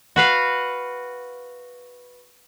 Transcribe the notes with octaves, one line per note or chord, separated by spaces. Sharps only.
F#4 B4 F5